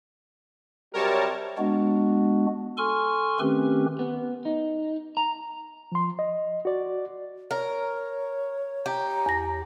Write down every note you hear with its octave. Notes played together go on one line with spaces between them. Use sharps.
C3 F#3 G3 A#4 C#5 A5
G#3 B3 D4 F#4
A4 G#5 C6 C#6 F6
D#3 A3 C4 C#4 G4 B4
B3
D#4
A#5
F3 C6
D#5
F#4 D5
A#4 C#5
G4 A#5
E2 A#6